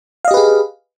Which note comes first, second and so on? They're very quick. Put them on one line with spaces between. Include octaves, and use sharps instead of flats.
F5 D#5 G4 B4 G#4